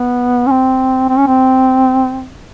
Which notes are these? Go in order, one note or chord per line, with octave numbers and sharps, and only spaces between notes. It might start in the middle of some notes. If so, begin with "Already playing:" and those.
Already playing: B3
C#4
C4
C4
C#4
C4